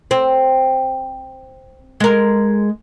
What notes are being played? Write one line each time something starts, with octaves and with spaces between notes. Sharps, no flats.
C4
G#3 A#4